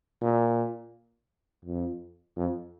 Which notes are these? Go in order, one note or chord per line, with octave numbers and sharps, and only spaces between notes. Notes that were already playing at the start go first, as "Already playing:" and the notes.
A#2
F2
F2